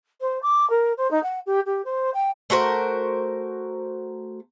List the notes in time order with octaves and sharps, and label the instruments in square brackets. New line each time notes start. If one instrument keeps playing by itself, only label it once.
[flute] C5
D6
A#4
C5
D#4
F#5
G4
G4
C5
G5
[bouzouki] A3 F#4 A#4 C5